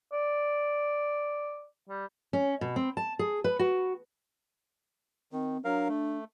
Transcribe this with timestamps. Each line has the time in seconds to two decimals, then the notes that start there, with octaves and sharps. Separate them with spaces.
0.13 D5
1.89 G3
2.33 C#4
2.61 B2
2.76 C4
2.97 A5
3.19 G#4
3.44 B4
3.59 F#4
5.32 D#3 C4
5.65 F#3 D4 A#4 F5
5.89 A3